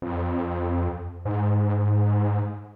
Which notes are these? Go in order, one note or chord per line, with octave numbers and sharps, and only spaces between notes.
F2
G#2